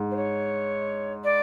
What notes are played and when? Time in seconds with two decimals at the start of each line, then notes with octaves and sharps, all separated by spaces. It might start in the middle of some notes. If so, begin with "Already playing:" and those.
Already playing: G#2
0.11 C5
0.16 C#5
1.24 D5